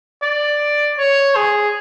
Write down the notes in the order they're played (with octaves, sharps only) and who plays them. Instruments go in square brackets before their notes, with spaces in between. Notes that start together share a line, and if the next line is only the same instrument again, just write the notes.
[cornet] D5
C#5
G#4